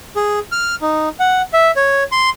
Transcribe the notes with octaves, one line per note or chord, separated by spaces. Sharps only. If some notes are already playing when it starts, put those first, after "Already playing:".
G#4
F6
D#4
F#5
E5
C#5
C6